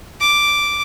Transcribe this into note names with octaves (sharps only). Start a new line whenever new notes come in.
D6